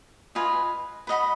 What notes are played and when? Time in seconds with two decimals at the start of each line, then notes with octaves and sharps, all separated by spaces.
0.35 F4 B4 D#5 G#5
1.07 B4 D#5 F#5 B5